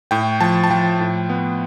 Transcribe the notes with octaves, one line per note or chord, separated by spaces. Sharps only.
A2 G5
F3 A5
A5
F3 G5
A2
B3